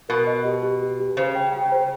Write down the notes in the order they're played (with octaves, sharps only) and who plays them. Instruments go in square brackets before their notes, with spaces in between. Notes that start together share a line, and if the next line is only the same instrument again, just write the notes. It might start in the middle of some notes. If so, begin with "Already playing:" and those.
[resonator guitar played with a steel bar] B2 [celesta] A#4
[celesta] D#5
G4
G4
G4
G4
[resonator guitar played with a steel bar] C#3 [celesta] C5
[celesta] G5
G5
C5